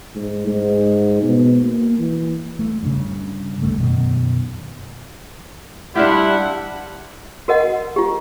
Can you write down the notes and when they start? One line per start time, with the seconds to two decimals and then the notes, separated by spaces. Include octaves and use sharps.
0.15 G#2
0.47 G#2
1.22 B2
1.63 A#3
1.99 E3
2.59 A3
2.83 G2 C#3
3.62 D2 G2 A3
3.78 F#2 B2 D#3
5.95 G3 D4 E4 F4 G4 F#5
7.48 F#4 A#4 D#5 F#5
7.96 F4 G4